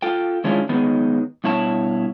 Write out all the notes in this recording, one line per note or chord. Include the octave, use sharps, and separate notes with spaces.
F4 A4 G5
D#3 G#3 C#4 D4 E4 F4
D#3 F#3 G#3 B3 D#4
G2 B2 E4 C#5 A5